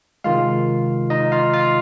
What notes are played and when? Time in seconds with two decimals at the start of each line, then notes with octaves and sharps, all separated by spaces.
0.24 C3 D#3 G#3 F4 F5
1.10 D#4 D#5
1.32 F4 F5
1.54 F4 F5